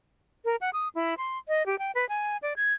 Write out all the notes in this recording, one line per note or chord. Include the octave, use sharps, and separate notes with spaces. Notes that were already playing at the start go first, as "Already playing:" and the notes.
A#4
F#5
D#6
E4
C6
D#5
G4
G5
B4
G#5
D5
G#6